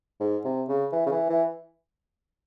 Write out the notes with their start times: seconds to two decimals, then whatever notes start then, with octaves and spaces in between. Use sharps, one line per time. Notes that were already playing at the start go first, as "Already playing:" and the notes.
0.20 G#2
0.45 C3
0.69 C#3
0.93 E3
1.06 C#3
1.12 E3
1.29 E3